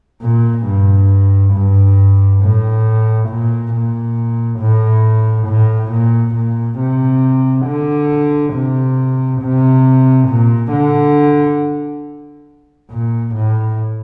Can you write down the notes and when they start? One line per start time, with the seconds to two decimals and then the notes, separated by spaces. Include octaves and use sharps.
0.23 A#2
0.66 G2
1.54 G2
2.42 A2
3.30 A#2
3.73 A#2
4.60 A2
5.48 A2
5.92 A#2
6.35 A#2
6.79 C3
7.66 D3
8.54 C3
9.42 C3
10.29 A#2
10.72 D3
12.91 A#2
13.35 A2